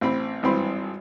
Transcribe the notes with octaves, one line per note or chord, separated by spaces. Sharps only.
A1 C4 B5
G#1 G2 E3 C4 B5 C6